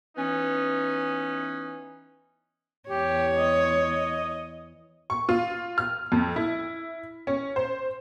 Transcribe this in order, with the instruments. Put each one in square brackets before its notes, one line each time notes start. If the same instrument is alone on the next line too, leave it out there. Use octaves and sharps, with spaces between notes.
[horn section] E3 B3 C#4 D#4
[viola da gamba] E2 C#5 [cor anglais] G4
[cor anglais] D#5
[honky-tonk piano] C#6
F4
F6
F2
E4
C#4
C5